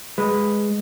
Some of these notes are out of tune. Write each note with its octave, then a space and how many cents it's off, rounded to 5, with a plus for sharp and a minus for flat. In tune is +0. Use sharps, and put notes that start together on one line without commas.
G#3 +0 B4 +5